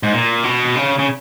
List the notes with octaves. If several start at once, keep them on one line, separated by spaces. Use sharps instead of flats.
G#2
A#2
B2
C#3
C#3